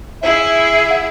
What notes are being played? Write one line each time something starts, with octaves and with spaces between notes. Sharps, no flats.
E4 G#4 E5
F#5